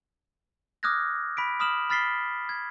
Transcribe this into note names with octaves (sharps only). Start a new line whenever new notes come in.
D6 D#6 F6 F#6 G#6 A#6
B5 B6 D7
B5 D#6 F6 E7 F#7
B5 F6 A6 B6 C7 G7
G#6